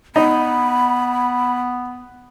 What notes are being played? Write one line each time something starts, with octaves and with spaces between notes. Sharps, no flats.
B3 D#4 B5